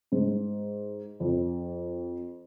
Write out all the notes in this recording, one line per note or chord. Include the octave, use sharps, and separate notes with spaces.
G#2
F2